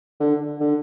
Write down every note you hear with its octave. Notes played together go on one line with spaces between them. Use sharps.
D3
D3